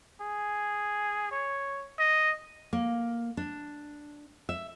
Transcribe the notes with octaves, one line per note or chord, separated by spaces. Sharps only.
G#4
C#5
D#5
A#3
D4
E5